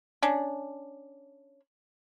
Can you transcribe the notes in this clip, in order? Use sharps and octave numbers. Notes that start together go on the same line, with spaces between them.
C#4 D4